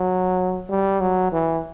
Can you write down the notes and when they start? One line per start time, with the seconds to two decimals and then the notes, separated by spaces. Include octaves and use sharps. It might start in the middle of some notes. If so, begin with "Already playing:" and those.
Already playing: F#3
0.69 G3
1.01 F#3
1.32 E3